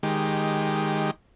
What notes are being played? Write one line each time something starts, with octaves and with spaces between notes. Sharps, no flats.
D#3 G#3 G4